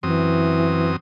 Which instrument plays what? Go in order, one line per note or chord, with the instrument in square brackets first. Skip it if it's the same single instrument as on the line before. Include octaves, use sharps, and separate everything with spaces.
[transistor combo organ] F#2 C4 D#6 [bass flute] E3